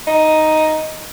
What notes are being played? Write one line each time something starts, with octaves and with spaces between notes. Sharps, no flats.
D#4